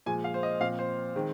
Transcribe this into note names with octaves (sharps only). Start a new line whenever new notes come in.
A#2 F3 G#3 G#5
F5
C5
D#5
A#2 F3 C4 F5
C5
D#3 G#3 C4